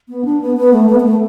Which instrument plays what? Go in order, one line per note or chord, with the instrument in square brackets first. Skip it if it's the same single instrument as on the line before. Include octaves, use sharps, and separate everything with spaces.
[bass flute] B3
D4
B3
B3
A3
B3
B3
A3